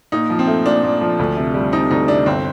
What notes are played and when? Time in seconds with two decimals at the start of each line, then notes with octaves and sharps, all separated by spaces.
0.12 A#2 D#4
0.30 F3
0.39 C4
0.47 A3
0.66 A#2 D4
0.83 A#2
1.01 F3
1.19 D2
1.37 C3
1.54 G3
1.72 C4 D#4
1.91 D2 D#4
2.08 C3 D4
2.26 G1 C4